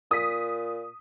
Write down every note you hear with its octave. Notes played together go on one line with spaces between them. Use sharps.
A#2 D#6 B6